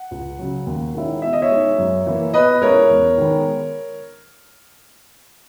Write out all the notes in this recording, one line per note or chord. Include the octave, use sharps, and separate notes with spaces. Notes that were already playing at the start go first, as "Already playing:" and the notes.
Already playing: F#5
C#2
C#3 F#3
D#2
D#3 G#3 C#4 E4
B2 E5
D#5
C#5 E5
G#3 D#4
F#2
E3 A#3
B2 B4 D#5
G#3 C#4 E4 A#4 C#5
E2
D#3 G#3 B3